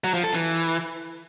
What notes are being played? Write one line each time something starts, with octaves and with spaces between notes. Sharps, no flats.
F#3
F3
A4
E3